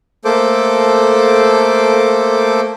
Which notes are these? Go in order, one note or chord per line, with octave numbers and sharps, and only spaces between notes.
A3 A#3 A4 C5 D6